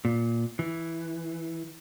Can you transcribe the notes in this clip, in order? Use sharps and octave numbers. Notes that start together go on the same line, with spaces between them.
A#2
E3